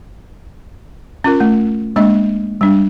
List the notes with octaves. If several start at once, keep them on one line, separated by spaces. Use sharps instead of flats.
C#4 F4 A#4
A3
G#3 A#3 D4 D#5
G3 D4